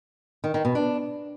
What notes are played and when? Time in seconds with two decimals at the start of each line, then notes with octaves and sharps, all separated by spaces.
0.44 D#3
0.54 D#3
0.65 B2
0.75 D4